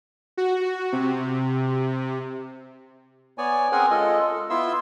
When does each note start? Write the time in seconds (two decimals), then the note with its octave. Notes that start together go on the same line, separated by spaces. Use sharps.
0.37 F#4
0.92 C3
3.38 B3 C#5 D5 G#5
3.72 C4 C#4 G#4 A#4 F#5 G#5
3.91 G#3 F4 A4 D#5
4.21 A4
4.50 B3 E4 F4 E5 C6 E6